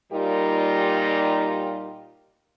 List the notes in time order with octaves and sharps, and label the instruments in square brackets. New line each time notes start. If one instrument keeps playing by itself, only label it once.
[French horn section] A#2 G3 D#4 F4 G4 A#4